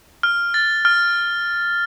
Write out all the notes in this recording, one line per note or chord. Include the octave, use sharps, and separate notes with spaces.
F6
A6
F6